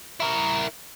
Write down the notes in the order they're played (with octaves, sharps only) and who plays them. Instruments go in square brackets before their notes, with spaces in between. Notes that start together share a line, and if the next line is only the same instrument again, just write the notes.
[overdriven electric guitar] E4 A#4